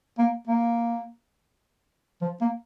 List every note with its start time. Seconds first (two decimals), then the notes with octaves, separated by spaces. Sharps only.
0.19 A#3
0.48 A#3
2.21 F3
2.41 A#3